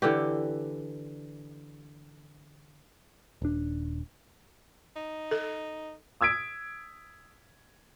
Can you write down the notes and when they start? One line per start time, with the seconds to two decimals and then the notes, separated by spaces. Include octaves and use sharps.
0.02 D3 E3 G4
3.42 D#1 D4
4.96 D#4
5.31 A4
6.21 D#6 E6 G#6 B6 D7